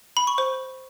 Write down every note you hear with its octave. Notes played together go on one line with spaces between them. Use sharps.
B5
C#6
C5